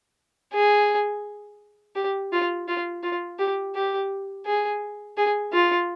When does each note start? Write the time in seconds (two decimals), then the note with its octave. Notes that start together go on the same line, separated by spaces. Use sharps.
0.53 G#4
1.95 G4
2.32 F4
2.68 F4
3.03 F4
3.39 G4
3.75 G4
4.46 G#4
5.17 G#4
5.53 F4